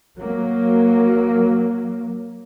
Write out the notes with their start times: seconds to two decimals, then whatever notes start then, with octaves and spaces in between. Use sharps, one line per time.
0.18 F#3 A#3